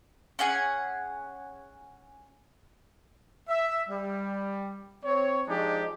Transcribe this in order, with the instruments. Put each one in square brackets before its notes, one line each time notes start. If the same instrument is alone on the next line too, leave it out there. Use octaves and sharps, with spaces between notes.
[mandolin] C#4 G#4 F#5 G#5
[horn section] E5
G3
C4 C#5
F3 G#3 D4 D#4 G4